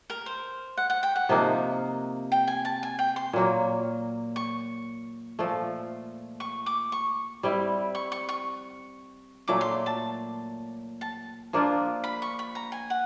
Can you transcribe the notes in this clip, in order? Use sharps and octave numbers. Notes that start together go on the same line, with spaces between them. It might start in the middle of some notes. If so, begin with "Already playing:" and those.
A#4
C5
F#5
F#5
G5
F#5
C3 F3 A#3 D#4
G5
G#5
A5
G#5
G5
C6
A#2 F#3 A#3
C#6
A#2 F3 A3
C#6
D6
C#6
G3 C4 E4
C#6
C#6
C#6
A#2 F#3 A3 D6
C6
A5
A5
F3 A#3 D4 F4
B5
C#6
B5
A#5
G#5
F#5